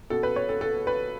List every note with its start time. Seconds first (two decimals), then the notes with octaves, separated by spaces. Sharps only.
0.10 B2 A4
0.23 B4
0.36 C#5
0.49 A4
0.61 A4
0.87 B4